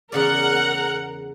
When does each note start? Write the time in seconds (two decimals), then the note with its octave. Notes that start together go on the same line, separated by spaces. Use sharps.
0.12 E2 C#3 A#4 D5 F#5